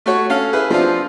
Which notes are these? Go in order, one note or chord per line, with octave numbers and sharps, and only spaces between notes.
A3 F#4 C#5
C#4 A4 F5
E4 G#4 B4
F3 C4 D4 F4